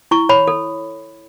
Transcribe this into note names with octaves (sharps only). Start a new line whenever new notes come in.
E4 C#6
C#5 B5
A4